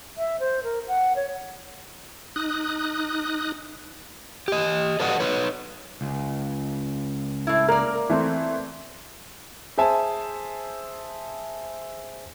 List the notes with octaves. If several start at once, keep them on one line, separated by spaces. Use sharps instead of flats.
E5
C5
A#4
F#5
C#5
D#4 D#6 F#6
G4 D#5
A4 B4 D5 D#5 F#5
D#4 B4 C#5
C#2
A2 E4
A#3 A#4 D5
E3 A3 C4
G#4 C5 E5 G#5 A5